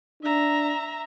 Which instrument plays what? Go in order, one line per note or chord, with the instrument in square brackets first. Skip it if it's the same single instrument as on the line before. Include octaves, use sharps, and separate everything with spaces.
[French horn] D4 [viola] E5 A#5